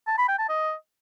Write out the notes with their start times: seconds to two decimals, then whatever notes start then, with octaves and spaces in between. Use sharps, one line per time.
0.07 A5
0.18 B5
0.28 G5
0.39 A5
0.49 D#5